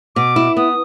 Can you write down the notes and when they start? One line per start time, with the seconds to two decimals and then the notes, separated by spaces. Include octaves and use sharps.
0.16 B2 D6
0.36 E4
0.57 B3 D#6